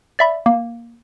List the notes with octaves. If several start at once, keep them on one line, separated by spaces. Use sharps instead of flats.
D5 E5 B5
A#3